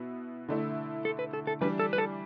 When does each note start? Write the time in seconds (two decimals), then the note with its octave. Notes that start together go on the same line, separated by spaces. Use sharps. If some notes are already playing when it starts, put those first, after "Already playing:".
Already playing: B2 B3 E4
0.48 D3 A3 E4
1.05 A4
1.19 B4
1.33 A4
1.47 A4
1.61 E3 G3 D4 B4
1.79 A4
1.93 B4
1.98 A4